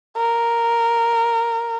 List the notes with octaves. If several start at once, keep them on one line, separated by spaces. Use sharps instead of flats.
A#4